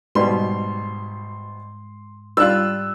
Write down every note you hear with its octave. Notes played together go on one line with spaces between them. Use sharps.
G#1 G#2 B2 G3 C6
G3 D4 F4 E6 F#6